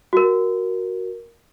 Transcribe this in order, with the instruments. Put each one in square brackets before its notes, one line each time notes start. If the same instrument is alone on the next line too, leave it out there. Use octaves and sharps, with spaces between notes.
[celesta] F#4 A#4